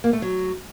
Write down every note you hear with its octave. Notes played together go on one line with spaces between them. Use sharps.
A#3
A3
F#3